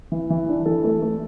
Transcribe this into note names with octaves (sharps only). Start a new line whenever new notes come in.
E3
E3
D4
E3 A4
A3
A3